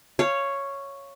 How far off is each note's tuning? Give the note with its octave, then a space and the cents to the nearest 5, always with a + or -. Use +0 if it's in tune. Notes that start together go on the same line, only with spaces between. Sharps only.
C#5 +0 F5 -20